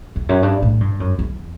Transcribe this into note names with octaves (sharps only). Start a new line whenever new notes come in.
E2
F#2
G2
A2
G2
F#2
E2